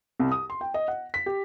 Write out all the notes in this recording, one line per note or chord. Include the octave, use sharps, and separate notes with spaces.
C2
D#6
C6
G5
D#5
F#5
B6
G4